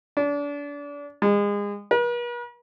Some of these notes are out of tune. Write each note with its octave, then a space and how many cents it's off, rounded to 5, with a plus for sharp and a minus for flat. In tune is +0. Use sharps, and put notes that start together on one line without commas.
D4 -30
G#3 -30
B4 -45